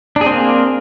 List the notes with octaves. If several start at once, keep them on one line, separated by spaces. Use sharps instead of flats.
A#3 C4 D4 G#4